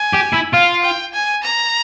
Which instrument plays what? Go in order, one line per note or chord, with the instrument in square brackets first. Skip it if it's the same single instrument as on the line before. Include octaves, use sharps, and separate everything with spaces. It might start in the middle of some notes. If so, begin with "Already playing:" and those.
Already playing: [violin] G#5
[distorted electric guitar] G4
E4
[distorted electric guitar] F4 [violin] F5
[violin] G5
G#5
A#5